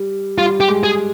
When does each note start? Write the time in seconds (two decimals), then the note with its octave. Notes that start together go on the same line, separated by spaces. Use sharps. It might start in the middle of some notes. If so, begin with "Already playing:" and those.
Already playing: G3
0.38 G3 F4
0.60 G4
0.68 G#3
0.84 G#4